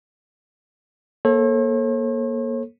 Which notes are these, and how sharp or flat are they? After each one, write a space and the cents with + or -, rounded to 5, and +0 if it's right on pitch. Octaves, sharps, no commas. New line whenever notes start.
A#3 +15 A4 +0 C#5 -45